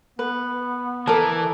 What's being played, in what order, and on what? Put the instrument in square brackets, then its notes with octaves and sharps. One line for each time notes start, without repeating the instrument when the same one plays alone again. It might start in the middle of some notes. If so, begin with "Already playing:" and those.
[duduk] B3 [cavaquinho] B4
[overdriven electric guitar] E3 [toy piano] A4 A5 [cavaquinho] A#4 D5